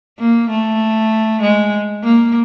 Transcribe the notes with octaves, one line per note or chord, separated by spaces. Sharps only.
A#3
A3
G#3
A#3